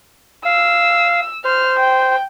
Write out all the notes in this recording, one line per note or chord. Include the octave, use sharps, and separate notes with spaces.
F5 E6
C5 F6
G5